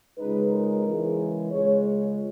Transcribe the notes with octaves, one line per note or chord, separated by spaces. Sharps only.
C#2 C#3 G#3 D#4 B4
A#4
C#3 E3 G#3
C#2 C#3 G#3 C#5
C#5